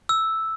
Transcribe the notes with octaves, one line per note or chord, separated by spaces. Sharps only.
E6